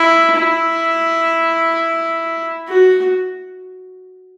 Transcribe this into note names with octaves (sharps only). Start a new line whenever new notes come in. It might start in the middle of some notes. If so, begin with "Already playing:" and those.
Already playing: E4
E4
F#4